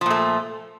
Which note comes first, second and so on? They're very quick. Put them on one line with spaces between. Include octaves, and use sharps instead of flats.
F3 A#2 A3